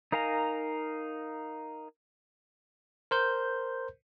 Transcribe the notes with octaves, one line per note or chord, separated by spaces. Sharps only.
D#4 A#4 F5 G#5 A#5
A#4 C5 G6